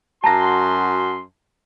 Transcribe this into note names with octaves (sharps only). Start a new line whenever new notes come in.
F#2 F#4 A5 A#5 C6 A#6